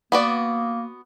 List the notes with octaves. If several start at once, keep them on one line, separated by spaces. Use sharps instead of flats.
A#3 B3 F#4 D5